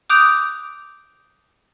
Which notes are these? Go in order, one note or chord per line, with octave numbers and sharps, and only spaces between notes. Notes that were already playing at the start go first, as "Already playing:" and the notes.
D6 D#6 F#6 G6 D7 F7